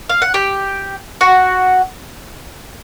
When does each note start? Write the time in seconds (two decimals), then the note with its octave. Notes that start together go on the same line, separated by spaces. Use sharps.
0.09 F5
0.22 F#5
0.34 G4 G5
1.21 F#4 F#5